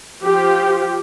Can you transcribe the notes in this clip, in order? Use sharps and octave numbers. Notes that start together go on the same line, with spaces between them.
F3 G4